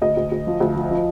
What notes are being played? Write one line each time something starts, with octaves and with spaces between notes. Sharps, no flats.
D2 D#5
D2
D2
F3
D2
F3
F3